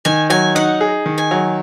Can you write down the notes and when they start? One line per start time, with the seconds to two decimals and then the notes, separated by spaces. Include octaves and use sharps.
0.05 D#3 G#5
0.30 F#3 G#5
0.55 D#4 F#5
0.81 G#4
1.06 D#3
1.18 G#5
1.31 F#3